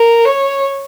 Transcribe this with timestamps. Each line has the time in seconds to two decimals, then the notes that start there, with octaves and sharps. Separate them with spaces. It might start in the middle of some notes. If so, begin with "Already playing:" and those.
Already playing: A#4
0.25 C#5